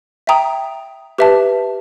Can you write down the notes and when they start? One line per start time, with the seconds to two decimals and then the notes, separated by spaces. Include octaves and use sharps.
0.27 E5 G5 A#5 D#6
1.18 G4 B4 E5 A5